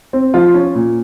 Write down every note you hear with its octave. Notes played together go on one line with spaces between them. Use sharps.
C4
F3 F4
C#4
A#2